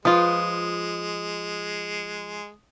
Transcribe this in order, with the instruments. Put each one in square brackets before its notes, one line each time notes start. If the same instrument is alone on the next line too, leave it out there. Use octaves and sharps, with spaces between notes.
[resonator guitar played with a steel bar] F3 [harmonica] G#3 [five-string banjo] F4 B4 [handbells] D#6